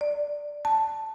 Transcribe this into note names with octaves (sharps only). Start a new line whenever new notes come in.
D5
A5